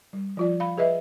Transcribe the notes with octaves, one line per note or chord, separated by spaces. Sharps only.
G3
F3 F4 D5
F5 B5
G#4 B4 D#5 E5